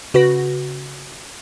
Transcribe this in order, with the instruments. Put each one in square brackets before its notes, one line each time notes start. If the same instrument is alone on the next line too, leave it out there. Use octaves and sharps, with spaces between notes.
[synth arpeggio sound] C#3 F#4 B4 A#6